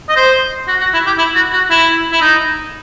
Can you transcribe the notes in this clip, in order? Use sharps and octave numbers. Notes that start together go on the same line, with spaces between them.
D#5
C5
F#4
F#4
E4
G4
E4
F#4
F#4
E4
E4
D#4